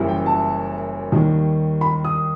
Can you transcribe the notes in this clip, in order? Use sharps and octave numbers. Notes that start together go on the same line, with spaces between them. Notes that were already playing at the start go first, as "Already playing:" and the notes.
Already playing: F#1 F#2 E3 G3
G5
A5
D#2 D#3 G3
B5
D#6